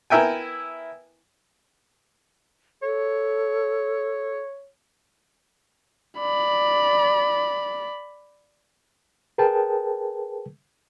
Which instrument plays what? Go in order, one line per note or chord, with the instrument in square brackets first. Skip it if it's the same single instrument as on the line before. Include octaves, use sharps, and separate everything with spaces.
[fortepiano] B3 E4 A#4 E5 G5 G#5
[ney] A4 [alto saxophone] C#5
[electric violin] D5 B5
[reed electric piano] G#4 A#4 B4 G5 A5